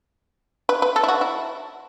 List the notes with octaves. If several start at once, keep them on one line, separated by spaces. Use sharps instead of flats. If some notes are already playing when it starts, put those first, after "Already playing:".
B4
B4
A4
E4
F#4
E4